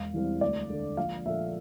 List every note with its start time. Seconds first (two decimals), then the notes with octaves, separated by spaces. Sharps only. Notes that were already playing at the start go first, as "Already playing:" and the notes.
Already playing: E1 F5
0.14 E2 E3 G3 C4
0.41 D2 D5
0.70 D3 A3
0.97 A#1 F5
1.25 A#2 F3 A3 E5